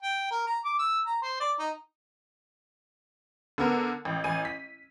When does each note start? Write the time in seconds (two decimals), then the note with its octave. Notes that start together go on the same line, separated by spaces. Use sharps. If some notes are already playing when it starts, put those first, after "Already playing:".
0.02 G5
0.31 A#4
0.46 A#5
0.65 D6
0.79 E6
1.06 A#5
1.22 C5
1.40 D5
1.59 D#4
3.58 D3 B3 A#4
4.05 A1
4.24 A1 G#5 D#7
4.45 B6